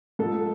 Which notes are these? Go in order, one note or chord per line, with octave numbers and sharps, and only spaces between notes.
G#2 F3 A4